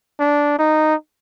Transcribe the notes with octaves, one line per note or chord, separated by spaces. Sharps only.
D4
D#4